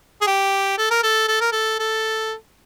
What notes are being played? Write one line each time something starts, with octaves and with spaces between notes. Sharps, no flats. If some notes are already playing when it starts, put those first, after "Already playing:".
G#4
G4
A4
A#4
A4
A4
A#4
A4
A4